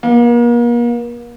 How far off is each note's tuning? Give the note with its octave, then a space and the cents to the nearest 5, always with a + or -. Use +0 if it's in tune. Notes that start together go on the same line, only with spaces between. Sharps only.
A#3 +40